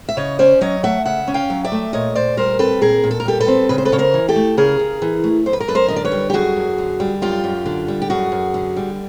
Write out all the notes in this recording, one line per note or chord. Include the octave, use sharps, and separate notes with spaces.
E5
C#3 C#5 D#5
C#4 C5 D5
F#3 C#5 D#5
A3 E5 F#5
C#3 E5 F#5
C#4
F5 G5
F#3
D5 E5
A3
A#2 C#5 D#5
A#2 C5 D5
G3 A#4 C5
C4 A4 B4
A#2 G#4 A#4
A#2
A4
A#4
G3 G4 A4
A4 B4
C4
C#3 B4
C5
A4 B4
C#3 C#5
A#4 C5
E3
G4 A4
A3
C#3 G#4 A#4
C#3
E3
A3
F#2 C5
B4
A#4
F#2 A4 B4
A#4 C5
D3 D#5
D5
B4 C#5
G3
G4
F#2 F#4 G#4
F#2
D3
G3
F#2 F4 G4
F#2
D3
G3
G4
F#2 F#4 G#4
F#2
D3
G3